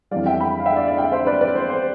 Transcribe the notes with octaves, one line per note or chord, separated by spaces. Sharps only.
F2 E3 G3 D5 F5
E5 G5
G5 B5
F5
E5 G5
D5 F5
D5 F5
E5 G5
C5 E5
B4 D5
B4 D5
C5
C5